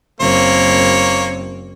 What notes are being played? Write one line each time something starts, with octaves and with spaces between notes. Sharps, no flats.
F#1 A#3 C4 C#5